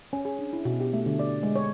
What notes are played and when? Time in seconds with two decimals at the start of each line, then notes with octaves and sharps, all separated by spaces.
0.13 C#4
0.25 G#4
0.39 D4
0.53 E4
0.65 B2
0.80 G4
0.93 A3
1.06 D3
1.19 D5
1.43 G#3
1.56 C#5